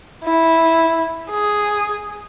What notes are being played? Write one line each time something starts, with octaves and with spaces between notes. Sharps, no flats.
E4
G#4